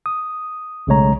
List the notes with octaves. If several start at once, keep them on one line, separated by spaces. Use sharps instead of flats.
D#6
B1 C#3 G#3 A3 C#5 A#5